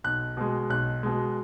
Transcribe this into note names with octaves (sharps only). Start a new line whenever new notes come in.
B1 F#6
B2 G#3
B1 F#6
B2 G#3